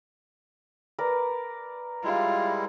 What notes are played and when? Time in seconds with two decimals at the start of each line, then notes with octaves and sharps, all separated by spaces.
0.99 A#4 B4 D5
2.04 G3 G#3 E4 F4